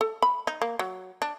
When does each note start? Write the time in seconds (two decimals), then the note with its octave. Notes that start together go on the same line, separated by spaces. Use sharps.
0.01 A4
0.22 B5
0.47 D#4
0.62 A#3
0.79 F#3
1.22 D4